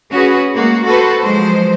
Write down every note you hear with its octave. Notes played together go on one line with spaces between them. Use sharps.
C#4 F#4 G#4 B4
G#3 A#3 F#4
F#4 A4 B4 C5
F3 F#3 G#3 C5